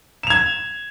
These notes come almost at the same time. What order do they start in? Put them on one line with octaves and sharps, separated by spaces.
E7 F7 G#6